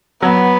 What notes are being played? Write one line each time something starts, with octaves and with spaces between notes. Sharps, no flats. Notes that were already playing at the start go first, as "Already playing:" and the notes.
F#3 B3